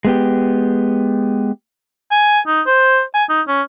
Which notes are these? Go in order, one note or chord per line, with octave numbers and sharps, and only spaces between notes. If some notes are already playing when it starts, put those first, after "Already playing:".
G#3 B3 G4
G#5
D#4
C5
G#5
D#4
C#4